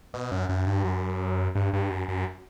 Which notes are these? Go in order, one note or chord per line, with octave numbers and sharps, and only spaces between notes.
B2
F#2
F#2
G2
F#2
G2
G2
F#2
F#2